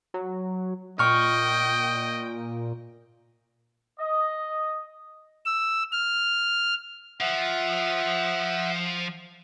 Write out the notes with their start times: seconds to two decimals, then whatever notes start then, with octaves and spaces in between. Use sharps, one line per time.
0.14 F#3
0.99 A#2 D#5 G5 C#6 F6
3.99 D#5
5.46 E6
5.92 F6
7.21 F3 E5 F#5